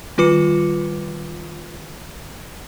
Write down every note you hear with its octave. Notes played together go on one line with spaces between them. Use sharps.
D#3 G3 F4 B4 D6 C#7